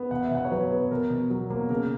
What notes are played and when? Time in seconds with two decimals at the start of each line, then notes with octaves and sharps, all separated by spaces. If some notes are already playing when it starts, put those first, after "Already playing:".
Already playing: B3
0.11 B2 F#5
0.23 E5
0.31 B2 F#5
0.45 C#5
0.51 F#3 B4
0.71 B3
0.91 B2 A#4
1.10 B2
1.30 F#3
1.50 A#3
1.70 C#3 A#4